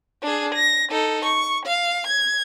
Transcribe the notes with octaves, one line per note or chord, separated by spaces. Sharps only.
D4 G#4
A#6
D#4 A4
C#6
F5
G#6